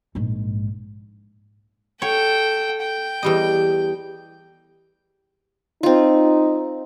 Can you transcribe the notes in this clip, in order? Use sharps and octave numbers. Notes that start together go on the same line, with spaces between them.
A#1 G#2
A4 C#5 G5
G5
E2 G3 D#5
C4 D#4 F4